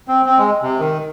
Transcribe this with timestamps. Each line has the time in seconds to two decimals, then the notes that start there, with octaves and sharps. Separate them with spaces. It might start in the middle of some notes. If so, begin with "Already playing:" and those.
0.08 C4
0.25 C4
0.38 G#3
0.62 C3
0.79 D#3